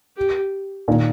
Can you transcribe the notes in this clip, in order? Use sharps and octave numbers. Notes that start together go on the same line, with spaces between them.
G4
A#2 D#3